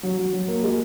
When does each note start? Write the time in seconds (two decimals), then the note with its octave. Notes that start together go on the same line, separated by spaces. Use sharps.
0.03 F#3
0.17 F#3
0.33 F#3
0.48 A#3
0.63 G#3